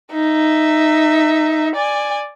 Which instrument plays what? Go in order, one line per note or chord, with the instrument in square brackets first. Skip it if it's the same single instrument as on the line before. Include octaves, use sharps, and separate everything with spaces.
[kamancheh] D#4 E5
D5 G#5